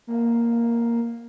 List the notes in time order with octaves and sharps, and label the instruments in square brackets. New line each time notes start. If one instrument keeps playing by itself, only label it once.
[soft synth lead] A#3